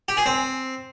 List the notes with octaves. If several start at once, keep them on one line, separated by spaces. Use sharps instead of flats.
G4
G#4
C4